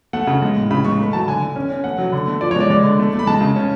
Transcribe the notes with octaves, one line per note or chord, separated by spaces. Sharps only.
A3 F#5
C#3
G#3
A2
C#3 B5
G#3 C#6
A3 B5
F#3 A5
D3 G#5
D3
C#4
C#4
A3 F#5
F#3
D3
A3
F3 D5
C#5
G#3 D5
G#3 D5
D3
A3
A3
B5
G#3 A5
C#3
C#4